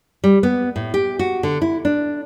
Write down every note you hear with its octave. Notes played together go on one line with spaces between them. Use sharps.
G3
B3
A2
G4
F#4
D3
E4
D4